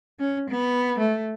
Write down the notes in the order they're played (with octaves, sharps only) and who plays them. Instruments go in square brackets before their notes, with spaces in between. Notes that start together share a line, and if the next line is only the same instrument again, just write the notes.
[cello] C#4
B3
A3